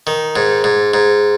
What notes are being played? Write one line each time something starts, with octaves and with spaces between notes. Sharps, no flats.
D#3
G#2
G#2
G#2